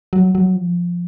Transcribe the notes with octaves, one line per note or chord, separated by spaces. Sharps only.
F#3
F#3
F3